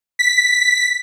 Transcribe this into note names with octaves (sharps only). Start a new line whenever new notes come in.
B6